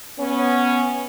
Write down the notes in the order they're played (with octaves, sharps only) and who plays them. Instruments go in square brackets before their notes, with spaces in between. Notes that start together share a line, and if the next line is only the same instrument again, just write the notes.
[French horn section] B3 C#4